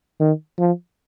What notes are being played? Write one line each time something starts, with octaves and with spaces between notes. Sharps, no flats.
D#3
F3